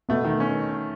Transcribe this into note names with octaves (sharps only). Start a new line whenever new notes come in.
B2 A3 B3
D#3
C#4